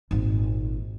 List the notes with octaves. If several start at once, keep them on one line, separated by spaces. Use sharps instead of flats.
G#1 A#2